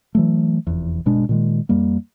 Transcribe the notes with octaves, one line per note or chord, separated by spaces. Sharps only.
E3 F#3 A3
F1 E2
G1 B2 G#3 D4
A#2 D#3 G#3
F2 G3 A#3